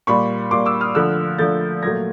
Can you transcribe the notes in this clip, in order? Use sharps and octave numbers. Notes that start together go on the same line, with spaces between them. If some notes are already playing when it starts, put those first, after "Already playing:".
A#2 G3 B5 C#6
A#2 G3 C6 D6
D6 E6
D#6 F6
D3 F3 A3 E6 F#6
D3 F3 A3 G6 A6
A#2 F#3 A3 G#6 A#6